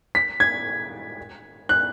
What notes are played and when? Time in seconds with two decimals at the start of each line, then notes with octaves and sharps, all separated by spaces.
0.15 B6
0.40 G#6
1.69 F#6